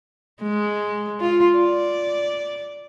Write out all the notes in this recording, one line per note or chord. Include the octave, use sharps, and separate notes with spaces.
G#3
F4
D5